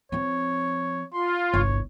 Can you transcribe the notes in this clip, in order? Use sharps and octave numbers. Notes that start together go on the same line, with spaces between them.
F3 C4 C#5
F4 C6
G1 C2 C#5